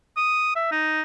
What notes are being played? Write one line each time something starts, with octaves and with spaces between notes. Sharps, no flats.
D#6
E5
D#4